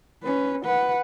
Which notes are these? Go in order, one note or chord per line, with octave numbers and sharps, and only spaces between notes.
C#4 B4
B4 F#5